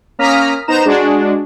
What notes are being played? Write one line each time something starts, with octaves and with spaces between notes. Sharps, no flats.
A#3 C#4 A#5 D#6 F6 B6
B3 D#4 C5 A#5 E7
G#3 D4 F#4 G#4